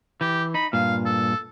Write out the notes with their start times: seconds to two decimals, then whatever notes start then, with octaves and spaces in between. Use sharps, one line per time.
0.21 E3 G4
0.54 D#4 B5
0.73 G2 A#2 F5
1.06 A4